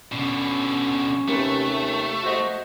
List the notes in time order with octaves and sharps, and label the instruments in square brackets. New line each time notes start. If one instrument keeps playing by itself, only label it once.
[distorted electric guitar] B2 D3 [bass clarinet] C#4
[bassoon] D#2 [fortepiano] C3 B4 [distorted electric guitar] A3
[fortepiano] F#4 C5 D#5